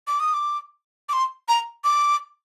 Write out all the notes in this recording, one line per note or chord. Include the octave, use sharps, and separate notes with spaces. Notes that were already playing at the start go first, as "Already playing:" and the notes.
D6
D#6
D6
D6
C6
A#5
D6